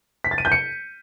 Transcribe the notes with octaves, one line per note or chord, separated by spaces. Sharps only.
B6
A6
D#7
G6
C#7